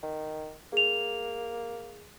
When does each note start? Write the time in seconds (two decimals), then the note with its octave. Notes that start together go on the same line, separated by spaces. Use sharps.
0.03 D#3
0.73 A#3 G#4 F7